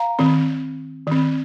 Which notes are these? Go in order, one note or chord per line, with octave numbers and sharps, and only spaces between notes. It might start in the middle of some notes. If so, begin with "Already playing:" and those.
Already playing: F5 A#5
D#3 C4
D#3 C4